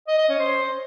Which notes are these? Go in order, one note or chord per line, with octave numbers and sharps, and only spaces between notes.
D#5
D#5
C#4
C5